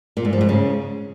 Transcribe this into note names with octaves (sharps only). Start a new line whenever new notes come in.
A#2
G#2
F3
G#2
C#3